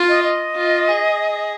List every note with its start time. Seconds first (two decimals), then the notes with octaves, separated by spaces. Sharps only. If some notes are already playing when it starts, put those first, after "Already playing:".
Already playing: F4
0.09 D#5
0.24 D#5
0.55 F4
0.88 G#4